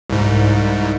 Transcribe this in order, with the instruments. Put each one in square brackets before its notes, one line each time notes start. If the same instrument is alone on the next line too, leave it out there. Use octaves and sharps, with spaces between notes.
[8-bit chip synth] C2 G#2